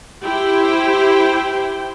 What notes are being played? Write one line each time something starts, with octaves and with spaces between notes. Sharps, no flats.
E4 G4 C5 G5